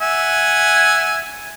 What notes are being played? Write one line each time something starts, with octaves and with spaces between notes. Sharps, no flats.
E5 F#5 G#5